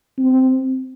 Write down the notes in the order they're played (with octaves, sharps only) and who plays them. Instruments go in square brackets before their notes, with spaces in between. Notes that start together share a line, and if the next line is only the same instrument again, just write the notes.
[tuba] C4